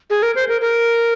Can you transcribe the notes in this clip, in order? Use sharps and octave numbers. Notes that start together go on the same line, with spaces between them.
G#4
A#4
C5
A#4
A#4